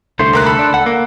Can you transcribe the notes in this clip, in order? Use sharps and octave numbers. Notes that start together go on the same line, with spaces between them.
C2 D3 A3 C5
D#2 A#4 F#6
A4 B5
D4
C#2 F#5
A#3